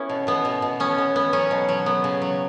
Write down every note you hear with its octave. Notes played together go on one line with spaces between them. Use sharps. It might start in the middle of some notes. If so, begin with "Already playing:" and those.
Already playing: B3 C#4 E4 F#4
B2
B2 B3
B2
B2
B3 C#4
B3
B3
F#3 C#4
B2
F#3
B3
C#3
F#3